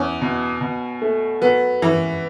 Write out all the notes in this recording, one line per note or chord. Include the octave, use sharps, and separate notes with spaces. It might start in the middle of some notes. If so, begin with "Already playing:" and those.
Already playing: E2 C#4
B2
B2
A3
F#3 B3
E3 C#4